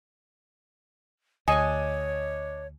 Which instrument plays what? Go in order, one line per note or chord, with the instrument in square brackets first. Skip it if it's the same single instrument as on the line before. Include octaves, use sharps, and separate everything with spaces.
[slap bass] D2 [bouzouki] D4 D#5 [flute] C#5 [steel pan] G#5